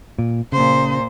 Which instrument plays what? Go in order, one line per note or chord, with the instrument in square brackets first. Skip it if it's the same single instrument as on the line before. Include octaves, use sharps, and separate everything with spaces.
[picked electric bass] A#2
[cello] A#2 C5 [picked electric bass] C#3